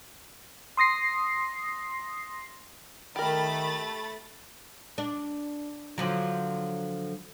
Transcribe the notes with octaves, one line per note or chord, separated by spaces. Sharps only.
C6 D#6 A#6 C7
D#3 A3 G4 A#4 B5 A6
D4
D3 F3 F#3